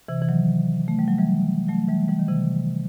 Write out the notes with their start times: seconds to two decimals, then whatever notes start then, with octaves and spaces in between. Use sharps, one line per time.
0.08 C3 E3
0.22 E3
0.29 D#3 F#3
0.88 A3
0.99 G3
1.08 F#3
1.18 E3 G3
1.69 F#3 A3
1.88 E3 G3
2.08 E3 G3
2.19 D#3
2.28 C3 E3